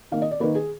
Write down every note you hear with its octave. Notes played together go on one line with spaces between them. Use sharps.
D#3 A#3 F5
D#5
D5
D#3 A#3 B4
G#4